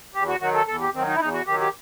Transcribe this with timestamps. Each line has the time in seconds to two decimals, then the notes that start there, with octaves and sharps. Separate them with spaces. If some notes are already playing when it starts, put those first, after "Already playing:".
0.14 E2 G4
0.28 F#4
0.41 D#3 F#3 F#4
0.54 A4
0.67 E2 A4
0.81 G4
0.94 D#3 F#3 C4
1.07 D#4
1.15 E4
1.20 E2 D#4
1.33 F#4
1.46 D#3 F#3 G4
1.60 G4